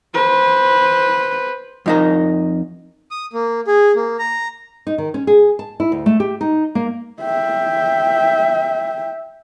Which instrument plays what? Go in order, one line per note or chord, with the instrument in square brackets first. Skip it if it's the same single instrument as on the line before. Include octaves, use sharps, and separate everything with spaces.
[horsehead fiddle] B4 C5
[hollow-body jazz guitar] F2 D#4 A#4
[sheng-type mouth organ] D#6
A#3
G#4
A#3
A#5
[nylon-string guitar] D#4
D#3
C#4
G#4
A5
E4
D2
A3
G4
D#4
A#3
[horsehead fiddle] E5 G5